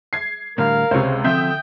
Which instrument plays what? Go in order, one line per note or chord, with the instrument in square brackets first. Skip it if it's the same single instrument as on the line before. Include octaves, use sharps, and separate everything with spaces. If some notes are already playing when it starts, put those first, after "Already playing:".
[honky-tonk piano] G#6 C7
[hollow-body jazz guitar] A2 D3 G3 [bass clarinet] A#4 [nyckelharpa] F5
[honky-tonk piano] C#2 C3 [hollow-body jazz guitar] C5 C#5
[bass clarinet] D3 [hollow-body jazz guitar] F3 C4 [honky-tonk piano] E5 D#6 G6 [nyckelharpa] G5